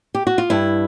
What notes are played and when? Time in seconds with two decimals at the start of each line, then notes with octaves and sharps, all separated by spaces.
0.15 G4
0.27 F#4
0.38 F4
0.50 G2 E4